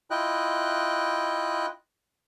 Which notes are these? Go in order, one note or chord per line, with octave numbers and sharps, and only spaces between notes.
E4 F4 D#5 G5 F#6